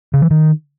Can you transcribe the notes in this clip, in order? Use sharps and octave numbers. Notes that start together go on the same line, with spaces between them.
C#3
E3
D#3